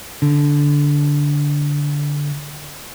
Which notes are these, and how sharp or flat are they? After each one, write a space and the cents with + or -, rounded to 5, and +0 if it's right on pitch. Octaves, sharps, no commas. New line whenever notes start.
D3 -10